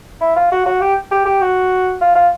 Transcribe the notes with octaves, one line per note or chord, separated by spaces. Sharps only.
E4
F4
F#4
F#4
G4
G4
G4
F#4
F4
F4